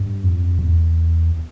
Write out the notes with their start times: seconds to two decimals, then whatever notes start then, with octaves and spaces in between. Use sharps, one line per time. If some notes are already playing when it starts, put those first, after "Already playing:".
Already playing: G2
0.23 F2
0.59 E2